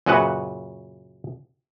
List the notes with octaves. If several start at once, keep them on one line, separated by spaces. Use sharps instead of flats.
F#2 A#2 C#3 F#4 B4 F#5